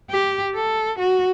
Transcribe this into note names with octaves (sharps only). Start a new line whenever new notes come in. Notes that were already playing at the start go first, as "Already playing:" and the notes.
G4
A4
F#4